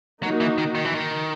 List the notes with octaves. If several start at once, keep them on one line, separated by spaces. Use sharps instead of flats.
F#3 A#3 D#4 F#4
E3
D#3
D#3
E3
D#3